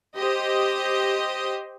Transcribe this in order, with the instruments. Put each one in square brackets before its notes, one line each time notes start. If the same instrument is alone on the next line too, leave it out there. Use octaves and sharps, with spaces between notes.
[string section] G4 C5 D#5